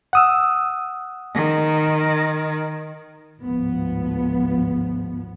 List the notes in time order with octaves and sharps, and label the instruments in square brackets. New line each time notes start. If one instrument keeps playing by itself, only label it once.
[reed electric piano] F#5 D#6 E6
[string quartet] D#3
[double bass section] G#1 D2 A2 F3 B3